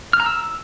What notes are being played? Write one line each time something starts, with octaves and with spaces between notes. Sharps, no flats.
F6
A#5
E6